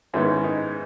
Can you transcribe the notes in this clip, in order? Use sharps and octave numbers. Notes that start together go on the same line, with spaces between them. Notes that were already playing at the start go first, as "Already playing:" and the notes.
G#2 D#3 G#3 B3 C#4 E4
D#4